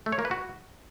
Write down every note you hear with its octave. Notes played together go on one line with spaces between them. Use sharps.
A3
C#5
A#3
B4
F#4